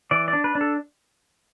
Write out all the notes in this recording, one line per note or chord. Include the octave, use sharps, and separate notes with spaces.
E3 D5
D5
D4
B4
D4
A4